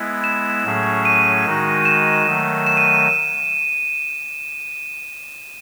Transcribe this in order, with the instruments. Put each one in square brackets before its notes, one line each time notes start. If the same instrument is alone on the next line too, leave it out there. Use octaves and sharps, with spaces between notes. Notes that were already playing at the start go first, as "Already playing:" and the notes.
Already playing: [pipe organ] G#3 B3 E4
[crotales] E7
[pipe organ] A2 F#3 A3 C#4 G#4
[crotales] D#7
[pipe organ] D#3 G#3 D#4 F#4
[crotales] E7
[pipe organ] D#3 F#3 A3
[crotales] E7
D#7